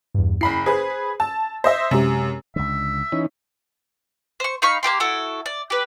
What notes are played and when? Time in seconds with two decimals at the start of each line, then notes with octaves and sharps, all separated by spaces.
0.14 E2 G2
0.41 F#1 E4 B5 C7
0.66 G#4 B4 C5
1.20 A5 E6
1.64 C5 D#5 E5
1.91 F#2 C3 G#3 G4
2.56 C#2 D3 E5
3.12 E3 C#4 D#4
4.40 C5 C#6
4.62 D#4 F5 B5 C#6
4.83 A#3 B3 G4 C6
5.00 E4 F#4 A4
5.46 D5
5.70 G4 B4